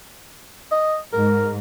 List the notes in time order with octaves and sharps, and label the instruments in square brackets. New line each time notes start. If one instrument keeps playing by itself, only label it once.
[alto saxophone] D#5
[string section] G#2 [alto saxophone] A#4